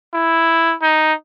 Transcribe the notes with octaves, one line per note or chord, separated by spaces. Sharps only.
E4
D#4